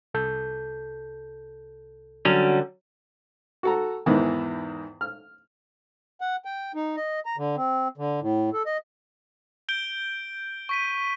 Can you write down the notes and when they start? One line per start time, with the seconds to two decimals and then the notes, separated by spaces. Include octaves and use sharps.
0.14 C2 A4 G6
2.25 D3 F#3 G3 C#4
3.63 F#4 A4 A#5
4.06 E2 G#2 D#3 E3
5.01 F6
6.21 F#5
6.45 G5
6.75 D#4
6.97 D#5
7.26 A#5
7.37 D3
7.56 C4
7.97 D3
8.21 A2
8.53 A4
8.66 D#5
9.69 G6 D7 G7
10.69 C#6 B6 D#7